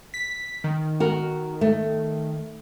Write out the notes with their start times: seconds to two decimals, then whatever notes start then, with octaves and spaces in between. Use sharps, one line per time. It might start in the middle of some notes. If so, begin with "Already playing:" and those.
0.14 B6
0.64 D#3
1.00 F#4 A#4
1.61 A3